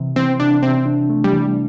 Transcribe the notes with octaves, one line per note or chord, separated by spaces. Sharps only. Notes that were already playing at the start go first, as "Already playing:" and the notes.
Already playing: C3 E3
E3 C4
C3 D4
C3 C4
D4
A3
G3
E3